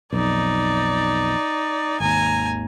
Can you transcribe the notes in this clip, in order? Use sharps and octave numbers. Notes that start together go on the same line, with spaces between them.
B1 F2 D#4 D5
G#1 D#2 G#5 A#5